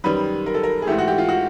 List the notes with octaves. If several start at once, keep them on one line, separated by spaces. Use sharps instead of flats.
F#2 D#3 G3 B4
A#4
A4
A#4
G#4
G#2 E3 A3 G4
F#4
G4
F4
F#4